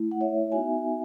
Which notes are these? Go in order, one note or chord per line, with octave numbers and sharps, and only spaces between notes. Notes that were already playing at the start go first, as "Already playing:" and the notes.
Already playing: A3 E4
F#5
C#5 E5
B3 D#4 F#4 E5 G#5